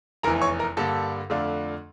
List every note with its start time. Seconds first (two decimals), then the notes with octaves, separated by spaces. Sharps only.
0.23 F1 E2 E3 A#4 A#5
0.42 C#5 C#6
0.59 A#4 A#5
0.77 G2 D3 G3 A#3 A4 A5
1.30 F2 D3 A3 D4 F4